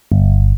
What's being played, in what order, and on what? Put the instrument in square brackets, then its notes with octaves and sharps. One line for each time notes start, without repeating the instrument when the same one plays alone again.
[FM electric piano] G1